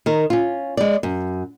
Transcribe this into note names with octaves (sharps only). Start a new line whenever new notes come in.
D#3 A#4
C#4 F4
G#3 D5
F#2